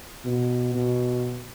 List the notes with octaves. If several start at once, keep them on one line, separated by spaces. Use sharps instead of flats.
B2
B2